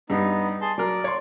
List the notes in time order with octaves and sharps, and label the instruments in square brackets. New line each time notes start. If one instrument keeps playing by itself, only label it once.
[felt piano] G2 G3 [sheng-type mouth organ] B3 D#4
[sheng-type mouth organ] G#4 A5 C6
[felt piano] F#3 A#4 [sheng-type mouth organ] D5
[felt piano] C#5 C6